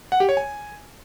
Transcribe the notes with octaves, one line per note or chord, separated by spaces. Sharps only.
F#5
G4
C#5
G#5